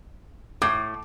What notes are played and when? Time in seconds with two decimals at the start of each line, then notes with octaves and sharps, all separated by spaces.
0.62 A2 D6